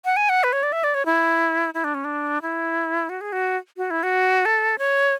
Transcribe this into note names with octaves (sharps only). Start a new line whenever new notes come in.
F#5
G#5
F#5
B4
C#5
D5
E5
D5
C#5
E4
E4
D4
C#4
D4
E4
F#4
G#4
F#4
F#4
E4
F#4
A4
C#5